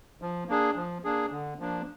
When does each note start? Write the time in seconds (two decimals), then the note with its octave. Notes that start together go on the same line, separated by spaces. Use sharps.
0.22 F3
0.48 A#3 D4 G#4
0.76 F3
1.04 A#3 D4 G#4
1.32 D3
1.59 F3 A#3 D4